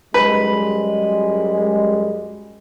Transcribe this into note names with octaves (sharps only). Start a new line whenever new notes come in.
F#2 G3 G#3 B4